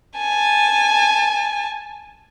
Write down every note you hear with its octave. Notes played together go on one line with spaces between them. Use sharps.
G#5 A5